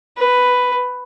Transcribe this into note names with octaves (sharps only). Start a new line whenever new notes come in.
B4